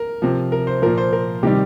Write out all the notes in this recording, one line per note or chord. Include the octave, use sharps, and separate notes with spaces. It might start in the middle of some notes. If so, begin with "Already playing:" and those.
Already playing: A#4
C3 F3
A#4
C5
A#2 F3 A#4
C5
A#4
C3 D#3 G3 G4